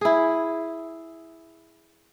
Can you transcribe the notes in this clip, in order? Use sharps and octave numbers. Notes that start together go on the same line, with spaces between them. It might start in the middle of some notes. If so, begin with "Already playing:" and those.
E4 G#4